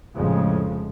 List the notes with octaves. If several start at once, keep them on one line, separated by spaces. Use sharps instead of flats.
F1 F2 A2 C#3 F3 G#3